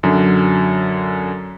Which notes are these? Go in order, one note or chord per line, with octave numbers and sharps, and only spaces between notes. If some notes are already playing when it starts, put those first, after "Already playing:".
F#2 D3 F#3